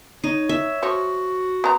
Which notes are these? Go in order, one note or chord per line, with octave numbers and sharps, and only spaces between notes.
D#4 C#5
E5
F3 F#4 C#5
B3 A#5